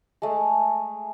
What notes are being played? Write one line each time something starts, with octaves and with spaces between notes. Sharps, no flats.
G#3 A3